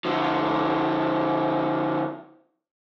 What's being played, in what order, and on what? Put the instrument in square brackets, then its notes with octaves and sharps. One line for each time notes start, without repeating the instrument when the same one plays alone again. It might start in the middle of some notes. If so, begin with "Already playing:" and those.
[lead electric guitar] D3 F3